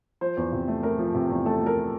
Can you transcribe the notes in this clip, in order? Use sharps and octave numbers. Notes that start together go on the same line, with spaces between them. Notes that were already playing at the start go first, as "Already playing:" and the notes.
F3 C5
E2
C3
A3
A3 A#4
F3
C3
E2
A3 A4
A3
A#4